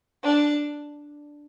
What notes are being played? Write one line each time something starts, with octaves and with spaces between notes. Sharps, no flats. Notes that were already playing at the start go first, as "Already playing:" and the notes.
D4